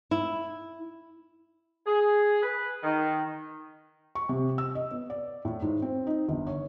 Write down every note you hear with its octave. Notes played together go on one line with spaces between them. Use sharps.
E4
G#4
B4
D#3
C#6
C3
E6
D#5
B3
D5
A2
G#2
C4
D#4
G1
C#5